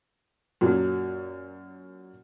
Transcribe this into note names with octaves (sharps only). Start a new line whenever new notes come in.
F#2 A#2 F#3